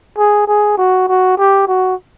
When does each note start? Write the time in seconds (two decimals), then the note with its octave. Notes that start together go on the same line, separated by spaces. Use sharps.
0.18 G#4
0.47 G#4
0.77 F#4
1.09 F#4
1.38 G4
1.68 F#4